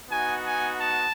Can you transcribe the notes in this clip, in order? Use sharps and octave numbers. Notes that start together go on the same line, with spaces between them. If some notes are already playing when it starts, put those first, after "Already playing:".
B3 D#4 F#4 G#5
G#5
A5